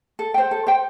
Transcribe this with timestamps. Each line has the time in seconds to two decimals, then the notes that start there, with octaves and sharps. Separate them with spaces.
0.19 A4
0.34 C5 G5
0.51 A4
0.67 C5 G5